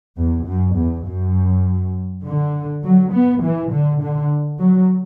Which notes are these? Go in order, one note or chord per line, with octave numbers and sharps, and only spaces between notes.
E2
F#2
E2
F#2
D3
F#3
B3
E3
D3
D3
F#3